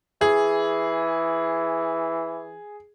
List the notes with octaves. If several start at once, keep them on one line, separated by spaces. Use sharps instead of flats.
E3 G#4